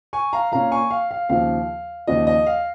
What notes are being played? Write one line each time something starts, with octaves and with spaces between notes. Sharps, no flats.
G#5 C#6
F5 A#5
A#2 A#3 C#4 F5 A#5
G#5 C#6
F5
F5
D#2 C#3 F3 F5
D#2 C#3 F3 D#5
D#5
F5